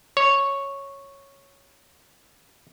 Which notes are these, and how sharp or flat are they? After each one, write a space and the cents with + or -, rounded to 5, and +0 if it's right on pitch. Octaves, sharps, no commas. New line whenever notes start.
C#5 -5